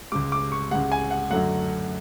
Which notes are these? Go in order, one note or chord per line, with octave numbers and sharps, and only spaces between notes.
C#2 C#3 G#3 D6
D6
C#6
C#2 C#3 G#3 F#5
G#5
F#5
F#2 D3 F#3 A3 F#5